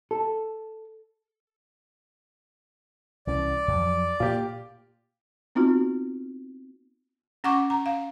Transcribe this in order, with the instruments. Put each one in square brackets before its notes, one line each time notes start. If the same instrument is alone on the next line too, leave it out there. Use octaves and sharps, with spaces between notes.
[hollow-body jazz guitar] A4
[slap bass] C2 E3 C#4 [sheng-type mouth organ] D5
[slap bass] F2 F3 F#3
[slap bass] A#2 A#3 [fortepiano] F4 G4
[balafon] B3 C4 D#4 F4 F#4
C#4 F#5 C#6 D6
A#5
F5